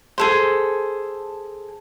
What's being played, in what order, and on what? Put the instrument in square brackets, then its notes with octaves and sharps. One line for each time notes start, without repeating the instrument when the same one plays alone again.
[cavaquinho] G#4 A4 C5